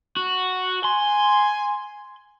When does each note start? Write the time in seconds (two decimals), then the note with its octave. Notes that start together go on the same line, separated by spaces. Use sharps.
0.17 F#4
0.84 G#5 C6